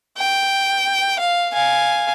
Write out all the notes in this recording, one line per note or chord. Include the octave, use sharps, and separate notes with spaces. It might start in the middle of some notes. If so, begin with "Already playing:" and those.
G5
F5
F5 G#5